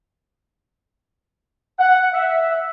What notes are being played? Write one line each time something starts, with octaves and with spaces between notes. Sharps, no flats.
F#5
E5